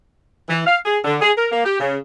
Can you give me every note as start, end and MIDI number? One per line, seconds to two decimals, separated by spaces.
0.49 0.61 52
0.66 0.78 77
0.85 0.99 68
1.04 1.16 50
1.21 1.31 68
1.37 1.47 70
1.51 1.62 58
1.65 1.80 67
1.80 1.97 49